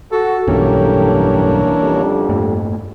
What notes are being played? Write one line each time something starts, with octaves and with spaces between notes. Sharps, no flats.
F#4 A4
B1 G2 E3 A#3 C#4 D4 G4 A4
F2 D3 G3
G2 A3 A#3